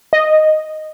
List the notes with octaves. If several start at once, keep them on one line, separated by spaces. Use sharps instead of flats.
D#5